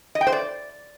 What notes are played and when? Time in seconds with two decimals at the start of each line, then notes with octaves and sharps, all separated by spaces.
0.15 D#5
0.21 G5
0.27 C5
0.32 D5